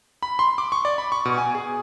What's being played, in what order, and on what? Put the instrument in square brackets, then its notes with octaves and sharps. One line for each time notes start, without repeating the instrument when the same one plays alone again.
[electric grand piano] B5
C6
D6
C#6
D5
B5
C#6
B2
G#5
G#4